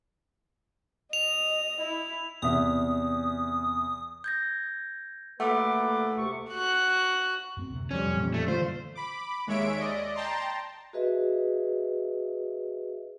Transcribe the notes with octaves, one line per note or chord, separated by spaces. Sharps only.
D#5 F7
E4
E2 C3 E5 D#6
G6 G#6 A#6
A3 A#3 B4 F#5 D6
D2 C3 C#6
F#4 F#6
F#2 B3 C4
D2 C3
F2 G3 C#4
A#2 E3 A#3
A3
D3 E3 F4 C5
B5 D6
D#2 G#3 C#5 E5 D7
D5 D#5
G5 A5 A#5 C6
F#4 G#4 B4 D#5 E5